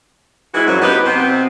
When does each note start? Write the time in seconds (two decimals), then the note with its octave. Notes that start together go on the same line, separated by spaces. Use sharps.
0.54 E3 G#3 C4 E4 F#4
0.67 F#2 A#2 F3 F#3
0.81 B3 D#4 G4 B4
1.06 C3 B3 C4